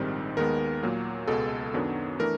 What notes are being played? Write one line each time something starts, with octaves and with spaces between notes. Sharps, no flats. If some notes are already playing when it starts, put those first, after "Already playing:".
Already playing: A#1 G#2 D#3 G3 C4
D#2 D#3 G#3 B3 A#4
A#2 F#3 A#3
C#2 B2 G#3 A4
F#2 D#3 F#3 B3 D4
E3 A3 D4 A#4